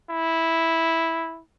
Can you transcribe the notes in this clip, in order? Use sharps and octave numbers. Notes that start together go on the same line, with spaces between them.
E4